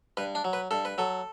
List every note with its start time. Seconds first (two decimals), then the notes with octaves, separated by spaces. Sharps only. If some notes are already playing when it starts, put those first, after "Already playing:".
0.17 G2 B4
0.35 D4
0.44 F#3
0.53 B4
0.71 G2 A4
0.85 B4
0.98 F#3 A4